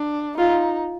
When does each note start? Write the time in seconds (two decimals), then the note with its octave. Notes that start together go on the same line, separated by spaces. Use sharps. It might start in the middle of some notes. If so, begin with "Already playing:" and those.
Already playing: D4
0.37 D#4 F4